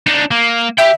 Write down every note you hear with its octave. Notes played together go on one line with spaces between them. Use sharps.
D4 D#4
A#3
G4 E5 G5